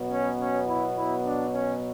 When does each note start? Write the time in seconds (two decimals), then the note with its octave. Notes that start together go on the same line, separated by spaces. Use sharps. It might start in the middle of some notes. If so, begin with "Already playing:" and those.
Already playing: B2 F#3 B3
0.10 C#4
0.39 C#4
0.68 E4
0.96 E4
1.25 D4
1.54 C#4